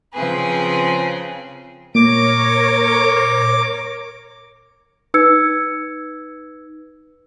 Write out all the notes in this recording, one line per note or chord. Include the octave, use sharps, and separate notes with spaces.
C#3 F3 C4 G#4 B4
A#2 A#4 C#5 D6
D#4 B4 E6 G#6 C#7